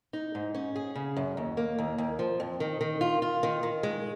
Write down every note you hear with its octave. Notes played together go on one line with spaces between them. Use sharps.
D#4
G#2
C#4
G#4
C#3
F#2
D#2
A#3
D#2
D#2
F3
F2
D#3
D#3
F4
F4
D#3
D#3
G#3